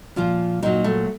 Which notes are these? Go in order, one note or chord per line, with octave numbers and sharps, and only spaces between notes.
A#2 F3 F4
A#2 F#3 D#4
A3